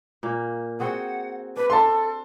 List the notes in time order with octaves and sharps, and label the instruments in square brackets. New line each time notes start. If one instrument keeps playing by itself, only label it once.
[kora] A#2 A#3
[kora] C4 F#4 G#4 [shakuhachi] F#5
[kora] D4 [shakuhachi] B4
[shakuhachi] A4 [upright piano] A5 C6